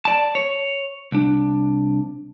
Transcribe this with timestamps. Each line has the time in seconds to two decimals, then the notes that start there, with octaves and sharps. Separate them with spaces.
0.05 D5 A5
0.35 C#5
1.12 C2 D4